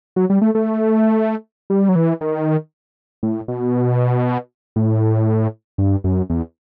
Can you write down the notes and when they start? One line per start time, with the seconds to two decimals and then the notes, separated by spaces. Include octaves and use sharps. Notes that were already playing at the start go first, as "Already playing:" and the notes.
0.16 F#3
0.30 G3
0.41 A3
0.55 A3
1.70 G3
1.89 F#3
1.96 E3
2.21 D#3
3.23 A2
3.48 B2
4.76 A2
5.78 G2
6.04 F#2
6.30 E2